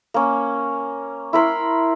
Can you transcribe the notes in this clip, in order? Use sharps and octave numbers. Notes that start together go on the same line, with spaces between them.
A#3 C#4
E4 A#4 B5 C6